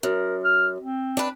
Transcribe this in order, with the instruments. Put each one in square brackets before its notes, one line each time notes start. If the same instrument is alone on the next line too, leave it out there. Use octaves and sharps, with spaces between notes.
[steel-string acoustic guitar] F#2 [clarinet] A#4
[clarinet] F6
C4
[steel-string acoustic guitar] D4 B4